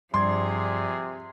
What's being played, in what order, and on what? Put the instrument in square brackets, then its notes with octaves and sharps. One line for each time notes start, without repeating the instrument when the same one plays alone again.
[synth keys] G2 D5 G#6 [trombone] C3 [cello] F3 G#4 [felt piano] C6